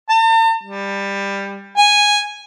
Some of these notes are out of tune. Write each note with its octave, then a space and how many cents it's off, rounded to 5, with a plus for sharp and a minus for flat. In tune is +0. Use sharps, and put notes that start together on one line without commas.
A5 +45
G3 +15
G#5 -5